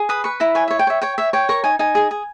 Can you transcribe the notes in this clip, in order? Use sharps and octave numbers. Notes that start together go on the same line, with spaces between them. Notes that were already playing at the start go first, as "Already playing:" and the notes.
Already playing: G#4
B4 D#6
B4 C#6
E4 A#5
C#5 G#5
C#5 E5
G5
C#5 E5
C#5 G5
C#5 E5
C#5 G5
A#4 C#6
D#4 G#5
D#4 G#5
G#4
G#4